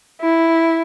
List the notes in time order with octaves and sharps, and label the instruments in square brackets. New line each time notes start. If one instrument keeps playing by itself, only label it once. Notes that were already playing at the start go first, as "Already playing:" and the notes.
[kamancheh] E4